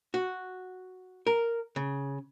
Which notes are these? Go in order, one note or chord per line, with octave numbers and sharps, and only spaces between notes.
F#4
A#4
C#3